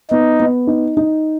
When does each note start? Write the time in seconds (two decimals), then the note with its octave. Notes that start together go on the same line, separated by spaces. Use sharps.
0.11 B3 D#4
0.40 B3
0.67 D#4
0.97 D#4